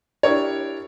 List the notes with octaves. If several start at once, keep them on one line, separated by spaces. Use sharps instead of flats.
D4 E4 G4 A#4 C#5